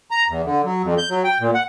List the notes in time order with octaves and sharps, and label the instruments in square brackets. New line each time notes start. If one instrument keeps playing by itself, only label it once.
[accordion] A#5
E2
D3
F#3
F2
G6
F#3
G5
A#2
F#5